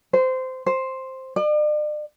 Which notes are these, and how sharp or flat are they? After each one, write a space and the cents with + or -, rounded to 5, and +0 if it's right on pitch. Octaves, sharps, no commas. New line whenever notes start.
C5 -20
C5 +5
D5 +40